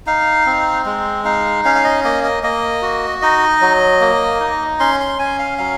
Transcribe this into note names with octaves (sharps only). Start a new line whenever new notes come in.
D#4 F5
C4
G#3
D#4 F5
C#4 F5
F5
D#5
A#3 D#5
D#5
A#3 D#5
F#4
D#4 D#5
F#3
A#3
D#4
C#4 C6
C6
C#4 G#5
F5
F#3 F5